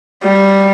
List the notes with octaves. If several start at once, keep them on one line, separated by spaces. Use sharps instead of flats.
G3